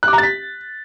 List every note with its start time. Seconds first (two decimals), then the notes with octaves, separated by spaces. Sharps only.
0.03 F#6
0.08 D6
0.13 A#5
0.18 A6
0.23 B6